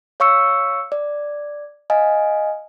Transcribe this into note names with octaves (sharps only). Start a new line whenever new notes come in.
C#5 F5 C#6 E6 C#7
D5
D#5 F5 G#5